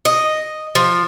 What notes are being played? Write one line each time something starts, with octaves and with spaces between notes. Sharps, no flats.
D#5
F3